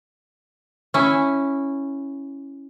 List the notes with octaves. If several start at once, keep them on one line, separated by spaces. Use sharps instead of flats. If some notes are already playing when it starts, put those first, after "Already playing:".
C#4 E4